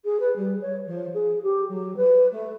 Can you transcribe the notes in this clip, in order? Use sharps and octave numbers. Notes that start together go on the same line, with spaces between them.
G#4
B4
G3
C#5
F3
G#4
G4
F#3
B4
A3